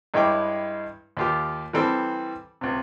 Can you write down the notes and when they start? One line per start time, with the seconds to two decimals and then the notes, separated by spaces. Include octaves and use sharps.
0.14 G2 G#3 E4 C#5 G5 D6
1.17 D#2 F4 G4
1.73 E3 G3 C4 A4
2.61 C#2 C3